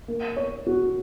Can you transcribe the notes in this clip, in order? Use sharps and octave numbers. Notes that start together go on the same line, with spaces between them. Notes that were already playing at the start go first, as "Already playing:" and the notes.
A#3
C#5
F#4